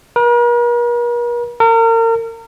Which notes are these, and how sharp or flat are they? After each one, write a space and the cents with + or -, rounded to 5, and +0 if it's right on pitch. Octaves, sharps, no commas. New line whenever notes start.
A#4 +45
A#4 -35